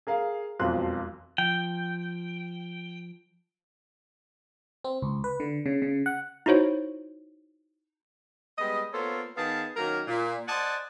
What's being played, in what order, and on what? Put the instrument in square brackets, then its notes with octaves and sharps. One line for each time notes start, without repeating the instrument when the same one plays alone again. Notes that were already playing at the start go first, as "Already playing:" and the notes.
[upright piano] G#4 A#4 F5
E1 B1 F2 F3 C6 F#6
[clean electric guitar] F3 [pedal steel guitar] G5
[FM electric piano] C4
C#2
B4
D3
C#3
C#3
F#5
[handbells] D#4 E4 F#4 C5 C#5
[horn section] G3 G#3 B3 D#5
A#3 B3 F4 A4 C5 C#5
D#3 B3 G#4 F5 A5
D#3 F#3 A#3 C#4 A#4
A#2
C5 D5 D#5 F#5 G#5 A5